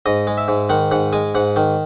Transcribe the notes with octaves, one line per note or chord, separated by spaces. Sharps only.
G#2 D#5
G#3
E5
G#2
D#3 F#5
G#2 F#5
G#3 G#5
G#2 F#5
D#3